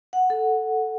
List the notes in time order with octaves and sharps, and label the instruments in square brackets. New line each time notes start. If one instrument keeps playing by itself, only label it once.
[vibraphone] F#5
A4